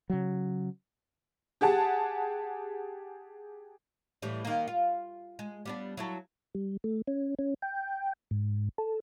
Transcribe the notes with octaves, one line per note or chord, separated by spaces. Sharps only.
C#3 F#3
G4 G#4 F#5 A5
A2 E3 G3
D#3 A#3
F4
G#3
G3 B3 D4
F#3 E4 A4
G3
A3
C#4
C#4
G5
G#2
A4